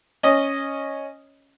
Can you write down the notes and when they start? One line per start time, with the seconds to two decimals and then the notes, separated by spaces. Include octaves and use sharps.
0.23 C#4 D#5